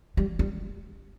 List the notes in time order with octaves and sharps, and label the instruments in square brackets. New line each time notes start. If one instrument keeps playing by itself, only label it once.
[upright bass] G3
G3